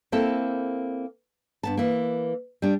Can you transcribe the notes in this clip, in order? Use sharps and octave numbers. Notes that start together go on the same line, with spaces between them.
A#3 C4 E4 A4
G2 B3 A5
E3 A#3
G3 D4